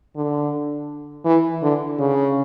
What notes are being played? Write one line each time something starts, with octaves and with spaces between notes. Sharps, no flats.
D3
E3
D3
C#3